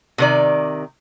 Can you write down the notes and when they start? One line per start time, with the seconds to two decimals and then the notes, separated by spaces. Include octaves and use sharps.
0.18 C3 D#3 D5